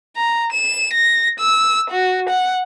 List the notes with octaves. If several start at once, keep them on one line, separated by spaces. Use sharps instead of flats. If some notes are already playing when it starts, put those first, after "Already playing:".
A#5
E7
A#6
E6
F#4
F#5